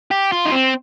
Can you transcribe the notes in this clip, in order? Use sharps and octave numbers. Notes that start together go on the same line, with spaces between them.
G4
F4
D#4
C4